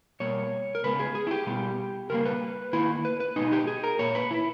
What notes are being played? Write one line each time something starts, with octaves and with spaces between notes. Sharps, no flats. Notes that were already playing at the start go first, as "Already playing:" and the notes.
B2 G3 A#3 C#5
A#4
C#3 G#3 B3 B4
G#4
G#4
E4
G4
B2 G3 B3
C#3 G3 A#3 A#4
B4
D#3 A#3 E4
B4
B4
B2 G#3 B3 D#4
G4
G#4
A#4
A#2 A#3 C#5
B4
E4